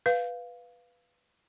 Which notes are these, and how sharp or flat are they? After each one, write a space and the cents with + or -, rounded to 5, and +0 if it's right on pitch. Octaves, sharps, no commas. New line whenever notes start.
B4 +0 F5 +0